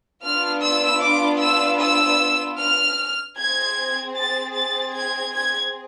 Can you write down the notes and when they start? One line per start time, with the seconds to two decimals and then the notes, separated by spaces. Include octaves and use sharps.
0.22 B3 D4 F4 F6
0.62 E6
1.02 D6
1.41 E6
1.80 E6
2.58 F6
3.37 C4 G#4 G#6
4.16 A6
4.55 A6
4.94 G#6
5.33 G#6